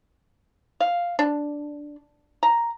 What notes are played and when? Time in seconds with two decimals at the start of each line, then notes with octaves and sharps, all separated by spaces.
0.80 F5
1.19 D4
2.43 A#5